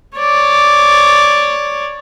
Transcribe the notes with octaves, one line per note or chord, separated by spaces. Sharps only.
C#5 D5